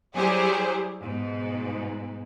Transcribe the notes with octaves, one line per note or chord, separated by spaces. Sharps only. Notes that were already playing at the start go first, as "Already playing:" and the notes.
F#3 G3 E4 G4 G#4 C5
G#2 B2